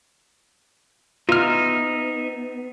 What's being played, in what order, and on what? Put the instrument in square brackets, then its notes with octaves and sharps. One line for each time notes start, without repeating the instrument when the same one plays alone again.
[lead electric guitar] B3 [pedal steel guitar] D#4 E5 [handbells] F4 F6